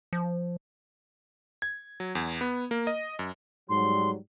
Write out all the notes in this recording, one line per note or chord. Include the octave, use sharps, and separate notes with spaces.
F3
G#6
F#3
E2
B3
A#3
D#5
F#2
G#2 F#3 G3 C6